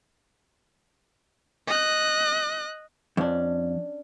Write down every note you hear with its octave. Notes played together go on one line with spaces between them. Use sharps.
D#5 F#6
F2 C#4 D4